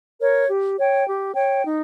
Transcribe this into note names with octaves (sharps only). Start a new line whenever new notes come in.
A#4 C#5
G4
C#5 G5
G4
C#5 G5
D#4